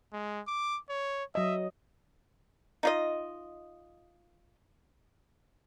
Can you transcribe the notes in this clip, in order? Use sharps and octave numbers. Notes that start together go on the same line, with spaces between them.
G#3
D6
C#5
F#3 D#5 E5
D#4 F4 D#5